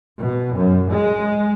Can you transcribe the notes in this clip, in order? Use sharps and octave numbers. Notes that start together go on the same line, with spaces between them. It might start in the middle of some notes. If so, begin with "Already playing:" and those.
B2
F#2
G#3